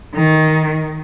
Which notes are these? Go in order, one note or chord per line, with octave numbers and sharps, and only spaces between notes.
D#3